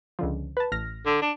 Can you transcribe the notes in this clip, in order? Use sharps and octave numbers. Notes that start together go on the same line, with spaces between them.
C#2 D3 F3
B4 A5
A1 F6 A#6
D3
D4